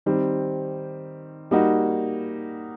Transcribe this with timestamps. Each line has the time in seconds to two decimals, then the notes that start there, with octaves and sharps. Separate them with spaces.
0.06 D#3 G3 C4
1.51 G3 A#3 D#4 F#4